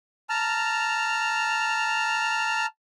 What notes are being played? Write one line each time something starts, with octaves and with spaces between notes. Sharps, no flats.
A5 A#5 F6